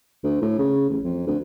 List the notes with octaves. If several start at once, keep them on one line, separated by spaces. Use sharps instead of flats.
D2
A2
C#3
A1
F2
D2